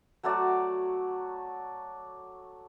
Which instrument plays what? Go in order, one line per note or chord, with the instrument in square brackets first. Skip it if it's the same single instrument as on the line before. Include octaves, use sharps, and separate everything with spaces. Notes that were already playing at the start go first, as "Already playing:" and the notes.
[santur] F#3 A3 F#4 D5